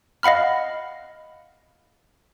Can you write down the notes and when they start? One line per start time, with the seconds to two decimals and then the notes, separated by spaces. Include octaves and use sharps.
0.23 D#5 F5 F#5 B5 F6